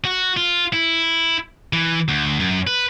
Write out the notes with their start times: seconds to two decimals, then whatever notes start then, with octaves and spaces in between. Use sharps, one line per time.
0.05 F#4
0.37 F4
0.73 E4
1.73 E3
2.08 D2
2.40 F#2
2.67 B4